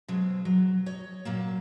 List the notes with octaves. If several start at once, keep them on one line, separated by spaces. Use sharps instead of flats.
B2 F#3 G#3 C4
F#3
C#5 D#5
A#2 F#3 A#3